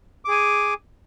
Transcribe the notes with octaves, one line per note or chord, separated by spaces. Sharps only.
G#4 G#5 D6